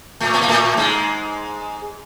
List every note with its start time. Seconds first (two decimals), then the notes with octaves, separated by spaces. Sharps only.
0.20 A2 A3
0.34 B3
0.41 A#3
0.49 A2 A3
0.77 G#2 G#3